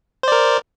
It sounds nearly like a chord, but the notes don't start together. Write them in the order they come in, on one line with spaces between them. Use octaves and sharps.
C5 D5 A#4